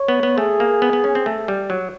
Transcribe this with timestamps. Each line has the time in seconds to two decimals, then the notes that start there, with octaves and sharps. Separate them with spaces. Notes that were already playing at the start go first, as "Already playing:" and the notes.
Already playing: C#5
0.08 B3
0.23 B3
0.37 A3 G#4
0.60 A#3
0.82 B3
0.93 B3
1.04 C#4
1.15 C4
1.26 A3
1.48 G3
1.70 F#3